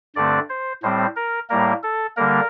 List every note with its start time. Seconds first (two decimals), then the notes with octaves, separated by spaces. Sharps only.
0.16 G2 D3 A3 C4 D5
0.49 C5
0.83 A2 G3 C4 C5
1.16 A#4
1.50 A2 G3 A#3 A#4
1.83 A4
2.17 D3 G3 A#3 A#4